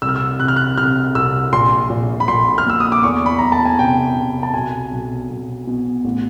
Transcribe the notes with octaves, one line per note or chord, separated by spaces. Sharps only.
C2 E6
F6
E6
C3 F#6
F6
F#6
C3 F6
C2 E6
A#1 C6
A#1
B5
A#1 C6
F6
A#2 E6
D#6
D6
E2 C#6
B5
E2 A#5
A5
G#5
C3 G5
C3
A5
B1 G#5
B1
B1
B2
A1